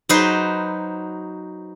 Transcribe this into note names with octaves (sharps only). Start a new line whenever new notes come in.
F#3 D#4 B4 C5